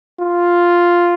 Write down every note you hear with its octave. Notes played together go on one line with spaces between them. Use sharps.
F4